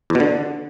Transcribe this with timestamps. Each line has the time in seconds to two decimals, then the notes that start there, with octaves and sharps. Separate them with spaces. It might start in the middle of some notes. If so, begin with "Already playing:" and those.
0.10 E2
0.15 B2
0.20 D3